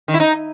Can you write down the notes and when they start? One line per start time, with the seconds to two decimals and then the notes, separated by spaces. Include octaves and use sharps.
0.08 D#3
0.14 E4
0.20 D#4